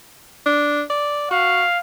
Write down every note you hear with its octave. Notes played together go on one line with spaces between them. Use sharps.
D4
D5
F#4 F5